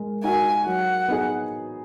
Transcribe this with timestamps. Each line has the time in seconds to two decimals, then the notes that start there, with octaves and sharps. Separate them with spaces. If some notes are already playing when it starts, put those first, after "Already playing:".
Already playing: G#3 A#4
0.24 D#4 F#4 A#4 G#5
0.66 F#3 F#5
1.08 B3 D#4 G#4